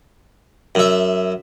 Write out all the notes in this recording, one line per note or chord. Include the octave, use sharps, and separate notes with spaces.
F#2 E5